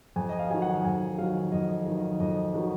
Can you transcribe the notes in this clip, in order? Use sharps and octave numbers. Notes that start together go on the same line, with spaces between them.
F2 G#5
D#5
F5
D#3 F#3 G#5
F#5
F2 G#5
D#3 F#3 F5
F2 D#5
D#3 F#3
D#5
F2 D#5
D#3 F#3